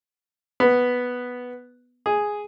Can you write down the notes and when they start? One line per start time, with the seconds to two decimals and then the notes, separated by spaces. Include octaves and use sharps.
0.60 B3
2.06 G#4